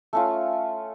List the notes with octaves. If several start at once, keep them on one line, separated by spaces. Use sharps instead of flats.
A3 C#4 F4